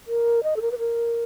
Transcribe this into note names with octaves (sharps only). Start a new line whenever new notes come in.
A#4
D#5
A4
A#4
B4
A#4